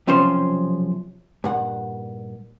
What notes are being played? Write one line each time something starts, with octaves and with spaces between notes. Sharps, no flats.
B1 C3 F3 C#4 C5
G2 A#2 F#5